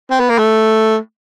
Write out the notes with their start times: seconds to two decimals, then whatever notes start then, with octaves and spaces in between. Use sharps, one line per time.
0.10 C4
0.20 B3
0.29 A#3
0.39 A3